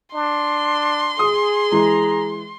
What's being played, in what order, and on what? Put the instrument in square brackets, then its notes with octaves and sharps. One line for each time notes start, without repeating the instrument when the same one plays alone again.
[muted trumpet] D4 [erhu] C6
[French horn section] G#4 [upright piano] D#6
[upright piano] E3 G#3 [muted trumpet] A#5